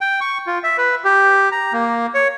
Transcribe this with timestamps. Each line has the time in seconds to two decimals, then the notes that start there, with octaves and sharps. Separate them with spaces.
0.01 G5
0.21 C#6
0.47 F4
0.63 E5
0.78 B4
1.04 G4
1.52 A#5
1.73 A#3
2.14 C#5